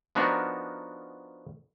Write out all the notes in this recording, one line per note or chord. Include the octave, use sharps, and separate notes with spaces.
F3 B3 D4 D#4 F#4 A#4